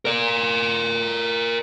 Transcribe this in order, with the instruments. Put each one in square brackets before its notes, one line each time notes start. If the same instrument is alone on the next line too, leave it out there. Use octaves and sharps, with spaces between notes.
[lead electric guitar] A#4 D5